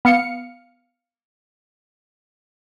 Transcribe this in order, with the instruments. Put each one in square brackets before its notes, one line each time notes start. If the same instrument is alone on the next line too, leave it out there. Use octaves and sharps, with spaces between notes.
[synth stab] B3 F5 C#7